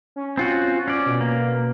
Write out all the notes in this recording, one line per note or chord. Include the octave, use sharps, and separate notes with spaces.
C#4
C4 F4 F#4
C#4 D5
B2
A#3